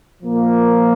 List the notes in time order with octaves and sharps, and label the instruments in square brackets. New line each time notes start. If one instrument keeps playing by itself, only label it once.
[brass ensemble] A#2 F3 A#3